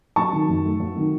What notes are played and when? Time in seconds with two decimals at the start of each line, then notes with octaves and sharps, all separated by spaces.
0.16 F#3 A5 C#6
0.33 D#3
0.49 F#2
0.65 A3
0.80 F#3
0.96 D#3